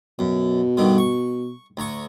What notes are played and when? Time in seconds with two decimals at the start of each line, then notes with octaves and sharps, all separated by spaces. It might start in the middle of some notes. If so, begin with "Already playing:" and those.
0.19 F#2 B2
0.77 G2 D3 D#3
0.98 C#6
1.77 D2 A#5 C#6